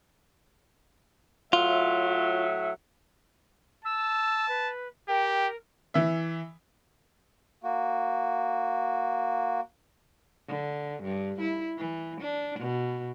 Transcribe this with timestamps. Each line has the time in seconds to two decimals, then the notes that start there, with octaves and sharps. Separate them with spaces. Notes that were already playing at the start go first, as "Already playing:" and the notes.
1.53 A2 F#3 F4 E5
3.85 A5 E6
4.48 B4
5.09 G4 A#4 G5
5.94 E3 E5
7.63 A#3 F#4
10.48 D3
11.03 G2
11.41 E4
11.78 E3
12.21 D4
12.60 B2